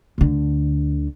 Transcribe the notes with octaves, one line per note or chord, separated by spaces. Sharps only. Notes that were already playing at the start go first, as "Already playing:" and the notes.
D2 D3